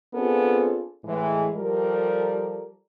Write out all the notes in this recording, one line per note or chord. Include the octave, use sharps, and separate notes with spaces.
B3 C4 D4 F4 G#4 A4
A2 E3 G#3
F3 G3 G4 A4 A#4